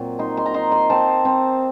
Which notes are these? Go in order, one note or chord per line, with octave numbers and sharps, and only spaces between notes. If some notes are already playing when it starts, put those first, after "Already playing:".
Already playing: A#2 F#3 C4
D#4 C6
C6
A#5
D#4 C6
C6
C4 A5
C4